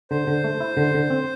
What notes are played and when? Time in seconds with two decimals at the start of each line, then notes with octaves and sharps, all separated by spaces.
0.11 D3 C5
0.27 D3
0.44 A3
0.60 E4
0.77 D3
0.94 D3
1.10 C4